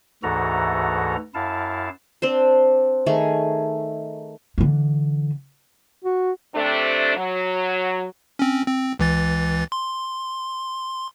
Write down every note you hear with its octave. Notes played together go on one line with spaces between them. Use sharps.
D2 G#2 E3 F#4 A4 A#5
F#2 E4 F5 A5
C4 D4 C5
D#3 A3 G#4 C#6
D3 E3
F#4
C3 A3 D4
F#3
C4 C#4
C4
C#2 E3 A6
C6